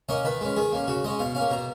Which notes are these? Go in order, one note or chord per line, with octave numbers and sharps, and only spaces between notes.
A#3 C#4 D#5
D#3 B4
G#3 C#4
D#3 G#4
A#3 C#4
C#3 F#4
G#3 C#4 D#5
B2 F5
A#3 C#4 F5
B2 A#5